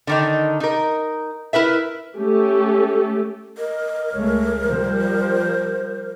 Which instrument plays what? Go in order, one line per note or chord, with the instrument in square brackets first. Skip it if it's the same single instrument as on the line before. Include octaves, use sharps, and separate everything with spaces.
[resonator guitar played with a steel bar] D3 D#3 D#4
D#4 A#4
E4 A#4 B4 E5
[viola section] A3 C#4 G4 A4
[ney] A#4 [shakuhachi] D#5
[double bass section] C#2 G#3 A3 [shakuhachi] C#5
[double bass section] F3 G3 [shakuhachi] C5